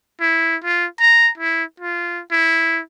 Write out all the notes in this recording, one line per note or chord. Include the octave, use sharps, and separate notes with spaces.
E4
F4
A#5
E4
F4
E4